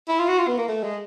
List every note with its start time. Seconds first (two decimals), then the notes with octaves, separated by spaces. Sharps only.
0.08 E4
0.19 F4
0.28 F#4
0.38 F4
0.48 B3
0.58 A#3
0.68 A3
0.83 G#3